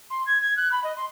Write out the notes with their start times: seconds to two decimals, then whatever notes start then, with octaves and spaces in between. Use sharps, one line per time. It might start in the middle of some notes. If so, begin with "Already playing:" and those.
0.10 C6
0.26 G#6
0.41 G#6
0.57 F#6
0.71 B5
0.84 D#5
0.96 C6